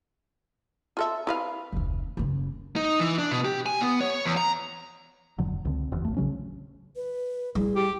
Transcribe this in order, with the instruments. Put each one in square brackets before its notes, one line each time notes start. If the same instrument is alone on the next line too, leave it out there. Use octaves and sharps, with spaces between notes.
[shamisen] F4 A4 E5
E4 B4 F5
[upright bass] F1 D2
F#1 C#3
[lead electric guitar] D#4
E3
D4
B2
G4
G#5
B3
C#5
E2
A#5
[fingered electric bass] E1 F2 D3 F#3
C#2 D3 C4
F#1 E2
A1 A3
A#1 C#3 F#3 C#4
[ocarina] B4
[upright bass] G3 E4 [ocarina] G#4
[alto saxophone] G4